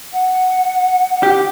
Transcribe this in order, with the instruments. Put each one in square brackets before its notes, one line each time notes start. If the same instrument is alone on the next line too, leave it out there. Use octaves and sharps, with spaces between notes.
[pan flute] F#5
[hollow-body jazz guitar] G4